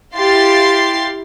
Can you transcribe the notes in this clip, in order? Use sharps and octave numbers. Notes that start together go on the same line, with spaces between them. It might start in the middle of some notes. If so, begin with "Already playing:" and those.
E4 G4 F5 C6 A6 C7